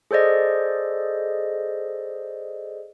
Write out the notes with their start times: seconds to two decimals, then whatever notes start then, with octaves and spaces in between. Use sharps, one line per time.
0.11 G#4 A4 C5 D5 D#5